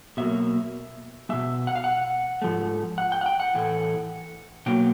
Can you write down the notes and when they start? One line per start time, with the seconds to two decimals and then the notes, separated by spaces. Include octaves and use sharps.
0.17 B2 F#3 A#3 E5
1.29 B2 G#3 E5
1.67 F#5
1.76 F5
1.84 F#5
2.42 G#2 F3 A3
2.98 F#5
3.12 G5
3.21 F#5
3.26 G5
3.40 F#5
3.54 A2 E3 A3
4.66 B2 F#3 A#3 G5